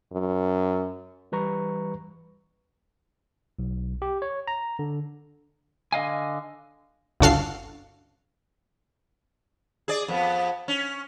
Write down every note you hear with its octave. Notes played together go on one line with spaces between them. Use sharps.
F#2
E3 G3 B4 A#5 C#6
B1
G4
C#5
A#5
D3
D3 D#5 F5 G#5
G1 C#2 F#4 A4 F5 C7
G#4 D5
F2 B3
C#4